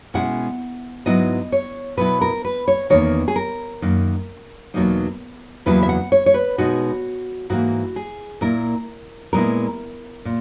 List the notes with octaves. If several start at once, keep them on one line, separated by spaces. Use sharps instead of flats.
B2 G#3 C#4 E4 F#5
G#2 F#3 B3 E4 D#5
C#5
B2 F#3 B3 E4 B4
A#4
B4
C#5
E2 D#3 A#3 C#5
G#4
A#4
F#2 D#3 A#3
E2 B2 F#3 A#3 D#4
E2 C#3 F#3 A#3 E4 B4
E5
F#5
C#5
C#5
B4
B2 G#3 D#4 F#4
G#2 E3 A#3 F#4
G#4
A#2 A#3 E4 A#4
A#2 G#3 B3 E4 A#4
A#2